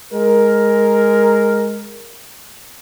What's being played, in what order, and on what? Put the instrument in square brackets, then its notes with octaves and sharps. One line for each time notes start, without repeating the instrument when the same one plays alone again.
[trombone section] G#3 A#4